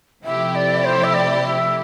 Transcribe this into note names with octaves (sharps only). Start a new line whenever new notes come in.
C3 F3 A3 E4 G4 E5
D5
C5
E5
D5
E5